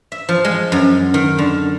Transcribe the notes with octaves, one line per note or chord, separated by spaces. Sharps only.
E5
F3
G#3
F#2
D#3
D3